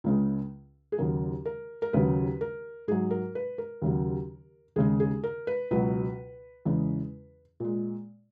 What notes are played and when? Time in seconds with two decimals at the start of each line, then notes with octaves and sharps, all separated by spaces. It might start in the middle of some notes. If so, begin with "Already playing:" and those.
0.04 C#2 C#3 G#3
0.92 G#4
0.98 D#2 C#3 F#3 A#4
1.46 A#4
1.82 A#4
1.93 D#2 C#3 F#3 B4
2.41 A#4
2.88 G#2 F#3 G#4
3.11 A#4
3.35 B4
3.58 A#4
3.82 D#2 C#3 F#3
4.76 D#2 C#3 G#3 G#4
5.00 G#4
5.24 A#4
5.47 B4
5.71 C#2 B2 F#3 B4
6.65 E2 C#3 G#3
7.60 A#2 G#3